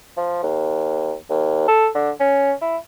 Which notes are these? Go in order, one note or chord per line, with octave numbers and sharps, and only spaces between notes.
F3
D#2
D#2
A4
D3
C#4
E4